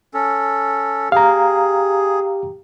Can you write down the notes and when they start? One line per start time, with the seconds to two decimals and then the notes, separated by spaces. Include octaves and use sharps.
0.14 C#4 A4
1.12 G4 G#4 F5 A#5